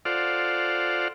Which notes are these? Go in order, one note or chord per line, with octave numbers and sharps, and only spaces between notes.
F4 A4 C5 D5 F5 F#5